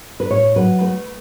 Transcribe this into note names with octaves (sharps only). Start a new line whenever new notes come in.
B4
A2 C#5
F#3 B4
A3 B4